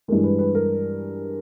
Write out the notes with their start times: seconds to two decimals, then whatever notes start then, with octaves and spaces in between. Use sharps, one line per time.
0.08 G2 E3 G#3 A#4
0.24 B4
0.39 B4
0.55 A#4